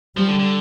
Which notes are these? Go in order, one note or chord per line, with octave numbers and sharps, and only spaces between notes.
F3 G3
D3
D3